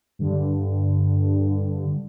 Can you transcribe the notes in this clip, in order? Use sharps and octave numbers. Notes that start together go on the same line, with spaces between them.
G2 D3